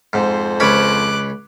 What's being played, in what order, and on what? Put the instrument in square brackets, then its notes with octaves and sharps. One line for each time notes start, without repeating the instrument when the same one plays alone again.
[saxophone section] F2 C5 [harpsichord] G#2
[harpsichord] C#2 C#5 B5 [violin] D6 F#6